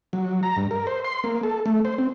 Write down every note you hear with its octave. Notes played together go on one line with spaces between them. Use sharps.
F#3
A#5
G2
A#4
C5
C6
A#3
A4
A3
C5
C4